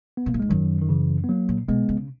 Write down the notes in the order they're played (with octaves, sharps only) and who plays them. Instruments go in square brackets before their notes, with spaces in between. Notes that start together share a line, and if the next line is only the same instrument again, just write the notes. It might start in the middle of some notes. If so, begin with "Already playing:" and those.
[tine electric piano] B3
[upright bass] B2 [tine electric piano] A#3
[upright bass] A#2
[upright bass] G#2 [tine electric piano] G#3
[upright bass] F#2 [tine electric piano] D#3 F#3
[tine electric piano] D#3
C#3 E3
B3
F#3 A#3
[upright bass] A#2
[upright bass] B2 [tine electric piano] G#3 B3
[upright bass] C#3